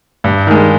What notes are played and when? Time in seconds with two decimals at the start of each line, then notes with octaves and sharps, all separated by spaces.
0.24 G2
0.47 D#3 G#3